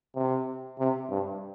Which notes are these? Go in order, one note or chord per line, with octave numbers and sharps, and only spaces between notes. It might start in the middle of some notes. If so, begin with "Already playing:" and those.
C3
C3
G2